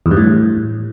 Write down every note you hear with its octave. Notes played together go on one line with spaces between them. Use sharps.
E2
G2
A2